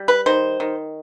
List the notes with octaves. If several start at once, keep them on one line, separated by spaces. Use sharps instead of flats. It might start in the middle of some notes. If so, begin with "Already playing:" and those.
Already playing: G3
B4
D#3 C5
D#3